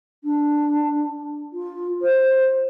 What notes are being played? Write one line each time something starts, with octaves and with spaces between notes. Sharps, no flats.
D4
F4
C5